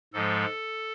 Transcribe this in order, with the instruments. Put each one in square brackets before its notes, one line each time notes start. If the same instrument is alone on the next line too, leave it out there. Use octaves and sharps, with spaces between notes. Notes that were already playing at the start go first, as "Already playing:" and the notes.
[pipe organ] G#2 F3 G#3 A4